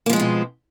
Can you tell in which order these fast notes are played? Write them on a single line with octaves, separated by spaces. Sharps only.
A#3 F3 G#3 C4 B2